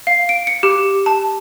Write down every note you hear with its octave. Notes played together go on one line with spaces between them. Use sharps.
F5
D7
C#7
G4
A5